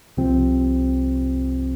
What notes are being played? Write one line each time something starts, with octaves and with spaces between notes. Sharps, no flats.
C2 C3 F3 C4